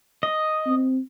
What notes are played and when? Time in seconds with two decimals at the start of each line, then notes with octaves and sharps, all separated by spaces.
0.23 D#5
0.66 C4